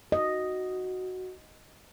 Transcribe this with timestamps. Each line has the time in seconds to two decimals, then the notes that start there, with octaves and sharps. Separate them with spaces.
0.12 F#4 D#5